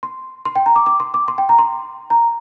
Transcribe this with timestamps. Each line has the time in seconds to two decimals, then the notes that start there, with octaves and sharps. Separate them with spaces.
0.03 C6
0.45 C6
0.56 G5
0.66 A#5
0.76 D6
0.86 D6
1.00 C6
1.14 D6
1.28 C6
1.38 G5
1.49 A#5
1.59 C6
2.10 A#5